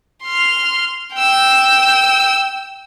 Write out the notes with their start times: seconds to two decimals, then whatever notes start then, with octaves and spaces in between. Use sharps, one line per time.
0.24 C6 F6
1.14 G5 E6